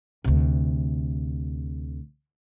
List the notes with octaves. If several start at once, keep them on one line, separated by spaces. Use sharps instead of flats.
D2 C3